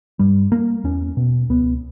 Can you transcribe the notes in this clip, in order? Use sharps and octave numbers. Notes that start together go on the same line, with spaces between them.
G2 G3
A#3
E2 C#4
B2
C#2 B3